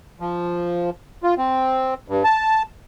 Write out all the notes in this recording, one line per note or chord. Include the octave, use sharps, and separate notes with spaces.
F3
F4
C4
G2
A5